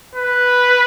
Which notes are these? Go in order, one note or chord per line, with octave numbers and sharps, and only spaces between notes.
B4